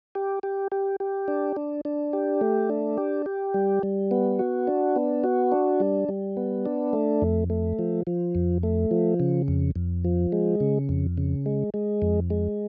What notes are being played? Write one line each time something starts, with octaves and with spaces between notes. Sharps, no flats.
G4
G4
G4
G4
D4
D4
D4
G4
A3
D4
G4
G4
G3
G3
B3
F#4
D4
B3
F#4
D4
G3
G3
B3
D4
A3
F2
A3
F3
F3
F2
A3
F3
C#3
F2
F2
F3
G#3
C#3
F2
C#3
G#3
G#3
F2
G#3